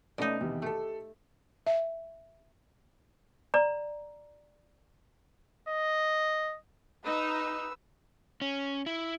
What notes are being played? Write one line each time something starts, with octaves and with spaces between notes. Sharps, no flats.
B2 A3 C#4 D#4 D5
E2 C3 D#3
A3 G4 A4
E5
D5 A#5
D#5
D#4 B4 E6
C#4
E4